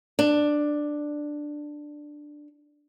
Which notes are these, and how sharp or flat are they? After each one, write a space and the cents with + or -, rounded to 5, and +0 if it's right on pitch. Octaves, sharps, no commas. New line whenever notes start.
D4 +10